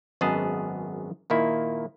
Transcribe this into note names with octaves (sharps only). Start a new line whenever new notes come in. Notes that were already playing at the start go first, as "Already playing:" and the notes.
G#1 F#2 B3 G#4 D#5 A5
A#2 D#3 A#3 E4